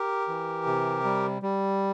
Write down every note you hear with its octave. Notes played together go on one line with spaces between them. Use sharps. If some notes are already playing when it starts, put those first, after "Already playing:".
Already playing: G4 A#4
E3
C3
G3
G3